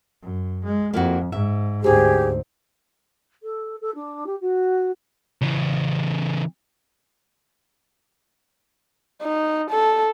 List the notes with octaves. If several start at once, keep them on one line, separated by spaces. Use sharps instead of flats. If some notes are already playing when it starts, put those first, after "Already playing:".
F#2
G#3
F2 A#3 E4 F#4
G#2 E5
D2 G#2 C4 D#4 G4 G#4
A4
A4
D4
G4
F#4
C#3 E3
D#4
A4